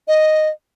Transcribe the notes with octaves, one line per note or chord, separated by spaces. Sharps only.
D#5